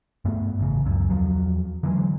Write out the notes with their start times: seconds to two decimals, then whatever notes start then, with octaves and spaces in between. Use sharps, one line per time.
0.25 G2 A3 B3
0.59 A1 C#3
0.85 C#2 F#2
1.10 E2 F3 F#3
1.83 D3 E3 F#3 G#3